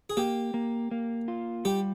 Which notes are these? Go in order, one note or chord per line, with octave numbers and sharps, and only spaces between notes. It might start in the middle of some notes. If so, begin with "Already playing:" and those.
G#4
A#3 G4
A#3
A#3
F4
G3 G4